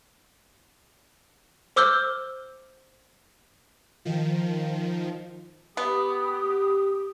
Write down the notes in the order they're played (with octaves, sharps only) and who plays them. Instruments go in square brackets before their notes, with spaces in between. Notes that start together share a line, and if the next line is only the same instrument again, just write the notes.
[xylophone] C5 D6 E6 F6 G6 G7
[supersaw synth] D#3 F3
[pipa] B3 [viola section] G4 [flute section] D#6